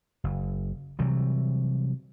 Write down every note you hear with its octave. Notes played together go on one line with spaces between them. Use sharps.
F#1
C3 E3 F#3 G3